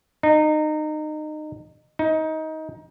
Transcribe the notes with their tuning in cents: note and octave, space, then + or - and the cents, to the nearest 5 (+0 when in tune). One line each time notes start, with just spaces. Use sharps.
D#4 -25
D#4 +20